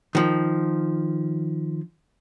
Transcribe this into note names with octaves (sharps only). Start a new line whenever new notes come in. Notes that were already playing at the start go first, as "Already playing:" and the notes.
D#3 F3